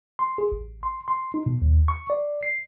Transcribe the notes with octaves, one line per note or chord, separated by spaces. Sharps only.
C6
G#4
A1
C6
C6
D#4
B2
D#2
C#6
D5
C7